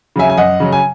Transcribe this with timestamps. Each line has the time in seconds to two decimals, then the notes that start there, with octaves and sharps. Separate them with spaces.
0.16 C#3 F#3 E5 G#5
0.30 G#5
0.37 F#2 D#5 F#5
0.60 C#3 F#3
0.72 G#5